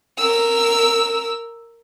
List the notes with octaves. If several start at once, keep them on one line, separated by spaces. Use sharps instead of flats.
A#4 E6